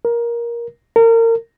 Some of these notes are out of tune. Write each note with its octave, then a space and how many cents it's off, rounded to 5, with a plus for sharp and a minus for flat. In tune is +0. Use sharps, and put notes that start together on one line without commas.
A#4 +15
A#4 -30